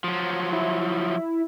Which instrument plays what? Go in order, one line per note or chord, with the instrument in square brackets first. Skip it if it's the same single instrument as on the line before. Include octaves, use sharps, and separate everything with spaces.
[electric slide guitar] F3 F#3
[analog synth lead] E4